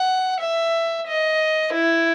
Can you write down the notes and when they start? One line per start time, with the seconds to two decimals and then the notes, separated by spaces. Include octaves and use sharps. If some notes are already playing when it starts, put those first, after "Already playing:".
Already playing: F#5
0.40 E5
1.08 D#5
1.73 E4